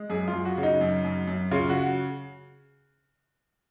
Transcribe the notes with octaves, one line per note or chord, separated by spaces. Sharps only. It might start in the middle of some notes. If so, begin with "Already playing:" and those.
Already playing: G#3
F#2 G#4
F4
F#2
F#4
C#3
D#4
F#2
F#2
F#2
C#3 F4
F#4